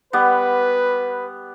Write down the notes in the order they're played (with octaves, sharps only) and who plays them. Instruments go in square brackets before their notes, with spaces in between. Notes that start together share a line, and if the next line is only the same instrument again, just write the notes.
[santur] G3 B3 [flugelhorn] B4